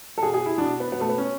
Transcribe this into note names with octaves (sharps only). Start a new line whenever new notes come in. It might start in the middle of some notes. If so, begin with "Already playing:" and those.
A4
B2 G#4
G#4
E4
B2 D4
B3
B2 B3
A3
B3
C#4